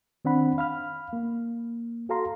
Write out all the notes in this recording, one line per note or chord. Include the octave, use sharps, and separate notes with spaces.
D#3 C4 D4 F#5 B5
F5 B5 F6
A#3
F#4 A4 F5 A#5 C6